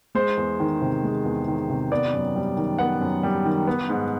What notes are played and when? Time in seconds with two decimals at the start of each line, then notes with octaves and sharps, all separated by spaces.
0.15 G#3 C5
0.37 E2
0.60 D#3
0.81 C3
1.04 G#3
1.25 E2
1.48 D#3
1.70 C3
1.92 B3 D5
2.13 F#2
2.36 G3
2.57 D#3
2.78 B3 F#5
3.01 F#2
3.23 G3
3.45 D#3
3.67 B3
3.89 G#2